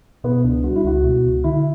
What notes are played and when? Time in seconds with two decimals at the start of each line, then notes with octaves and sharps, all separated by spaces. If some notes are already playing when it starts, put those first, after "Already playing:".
0.24 B2 B3
0.44 C#2 D4
0.64 G3 F#4
0.76 E4
0.84 C#2 F#4
1.03 B2
1.24 C#2
1.44 D3 E4